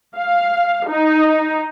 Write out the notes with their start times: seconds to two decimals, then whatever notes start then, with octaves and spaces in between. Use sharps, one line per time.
0.16 F5
0.89 D#4